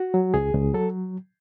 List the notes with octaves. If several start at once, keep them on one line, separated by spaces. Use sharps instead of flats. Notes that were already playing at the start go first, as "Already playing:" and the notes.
Already playing: F#4
F#3
C#2 G#4
C#2
F#3 A4